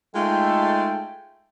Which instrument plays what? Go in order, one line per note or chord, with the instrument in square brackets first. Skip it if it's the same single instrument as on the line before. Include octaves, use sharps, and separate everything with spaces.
[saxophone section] G#3 D#4 F4 [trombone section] A3 [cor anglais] G5